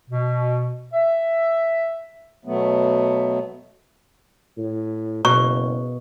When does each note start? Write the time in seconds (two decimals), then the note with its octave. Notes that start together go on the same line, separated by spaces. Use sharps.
0.10 B2
0.93 E5
2.45 B2 F#3 A3 B3
4.58 A2
5.25 F#1 B2 C#6